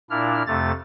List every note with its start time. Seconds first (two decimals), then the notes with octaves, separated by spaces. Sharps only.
0.10 A#2 D4 E4 F6
0.47 F2 C3 A3 A6